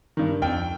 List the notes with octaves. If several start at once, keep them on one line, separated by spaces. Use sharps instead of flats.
G2 D#3
F2 G5